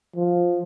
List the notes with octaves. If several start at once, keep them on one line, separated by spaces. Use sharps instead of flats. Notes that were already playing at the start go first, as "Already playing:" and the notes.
F3